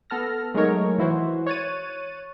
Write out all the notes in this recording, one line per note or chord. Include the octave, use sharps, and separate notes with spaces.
B3 A4 F6 A#6
F#3 G#3 A3 D#4 A#4 C#5
E3 E4 F#4 C5
C#5 F#6 A6 D#7